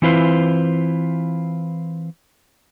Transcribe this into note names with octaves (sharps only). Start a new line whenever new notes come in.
E3 C4 E4 F4 B4 C5